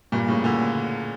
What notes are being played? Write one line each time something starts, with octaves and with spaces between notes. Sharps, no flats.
G2 A#2
A2 C#3
A#2 D3